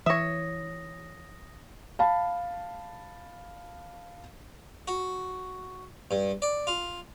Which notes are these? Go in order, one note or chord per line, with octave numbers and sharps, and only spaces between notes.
E3 C#5 E5 D#6 A#6
F5 A5 B5
F#4
G2
D5
F4